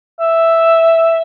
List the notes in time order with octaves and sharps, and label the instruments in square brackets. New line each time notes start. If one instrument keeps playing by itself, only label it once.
[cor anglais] E5